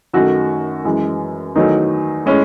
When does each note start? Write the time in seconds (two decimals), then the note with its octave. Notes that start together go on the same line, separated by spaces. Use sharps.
0.13 F#2 D#3 A3 F#4
0.84 F#2 E3 G#3
1.55 E2 D#3 F#3 A3 D#4
2.26 A2 G#3 C#4